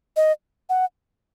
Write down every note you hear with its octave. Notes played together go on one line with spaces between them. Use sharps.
D#5
F#5